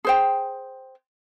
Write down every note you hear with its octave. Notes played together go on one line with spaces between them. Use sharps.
G#4 C5 G5